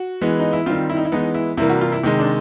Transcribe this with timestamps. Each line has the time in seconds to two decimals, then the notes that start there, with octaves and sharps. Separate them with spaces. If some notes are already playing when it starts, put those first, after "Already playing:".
Already playing: F#4
0.21 E3 G#3 B3
0.39 D#4
0.53 E4
0.66 D#3 G3 C4 F4
0.90 E4
0.97 D#4
1.05 E4
1.12 E3 G#3 B3 D#4
1.34 E4
1.57 C3 E3 G3 A#3 E4
1.69 F#4
1.81 F4
1.92 E4
2.03 C3 D#3 G#3
2.19 D4